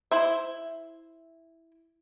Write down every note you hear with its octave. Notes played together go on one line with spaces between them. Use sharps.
E4 C5 E5